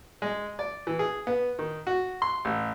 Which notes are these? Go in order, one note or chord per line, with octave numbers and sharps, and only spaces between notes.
G#3
D5
E3
G#4
B3
D#3
F#4
C6
A1